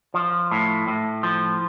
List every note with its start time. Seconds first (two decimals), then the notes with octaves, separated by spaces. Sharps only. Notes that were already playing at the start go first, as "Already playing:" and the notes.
0.14 F3
0.51 A2
0.88 A2
1.23 F3